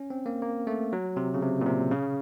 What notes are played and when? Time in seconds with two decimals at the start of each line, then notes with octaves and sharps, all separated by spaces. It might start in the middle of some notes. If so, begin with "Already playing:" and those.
Already playing: C#4
0.10 C4
0.26 A#3
0.42 A#3
0.67 A3
0.93 F#3
1.17 C3
1.34 C#3
1.42 C3
1.61 A#2
1.66 C3
1.91 C#3